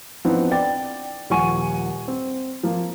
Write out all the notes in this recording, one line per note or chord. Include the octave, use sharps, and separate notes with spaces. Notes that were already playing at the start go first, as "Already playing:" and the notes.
E3 F3 B3 C4 D4 D#4
D5 G5 A6
D#1 F3 F#5 G#5 C#6 D#7
C4
F3 A#3